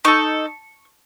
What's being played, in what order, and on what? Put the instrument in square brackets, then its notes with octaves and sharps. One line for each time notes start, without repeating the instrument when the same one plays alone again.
[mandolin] D#4 A4 C#6